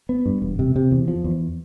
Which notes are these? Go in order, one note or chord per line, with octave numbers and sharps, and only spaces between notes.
B3
G2
E1
C3
C3
E2
F3
E2